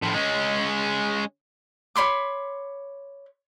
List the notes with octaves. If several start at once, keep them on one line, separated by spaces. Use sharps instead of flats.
A2 F3
G#3 C#4
C#5 B5 C6 D6